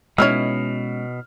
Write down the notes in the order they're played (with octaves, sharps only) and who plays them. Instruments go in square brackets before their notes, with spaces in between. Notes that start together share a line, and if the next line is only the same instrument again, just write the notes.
[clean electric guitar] B2 [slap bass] G#3 B3 C#4 [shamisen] D#4 E4 C#5 [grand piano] F6